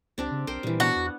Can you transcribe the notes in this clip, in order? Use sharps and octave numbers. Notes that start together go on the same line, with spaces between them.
C#2 C4 D4 G4
C#3
B1 A#4 C5 G5
A#2 E3 G3
B3 D4 F#4 F#5
E2